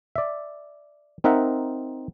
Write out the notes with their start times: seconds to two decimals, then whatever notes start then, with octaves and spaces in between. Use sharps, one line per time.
0.16 D5 E5
1.24 C4 D#4 A#4 E5 F#5